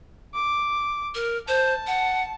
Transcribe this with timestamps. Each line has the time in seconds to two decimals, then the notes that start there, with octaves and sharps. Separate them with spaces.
0.34 D6
1.15 A#4
1.48 C5 A5
1.87 F#5